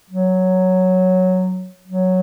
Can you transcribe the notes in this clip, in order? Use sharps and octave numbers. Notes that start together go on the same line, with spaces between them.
F#3
F#3